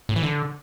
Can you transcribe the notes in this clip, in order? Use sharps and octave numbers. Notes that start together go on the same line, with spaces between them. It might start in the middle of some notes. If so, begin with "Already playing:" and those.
A2
E3
D3